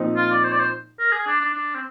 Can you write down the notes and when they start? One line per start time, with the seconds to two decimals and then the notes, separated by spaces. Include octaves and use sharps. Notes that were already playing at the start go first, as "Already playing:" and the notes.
Already playing: A#2 F3 C4 D#4
0.17 F4
0.31 D5
0.44 C5
0.52 D5
0.59 C5
0.99 A#4
1.12 G#4
1.27 D4
1.40 D4
1.53 D4
1.75 C4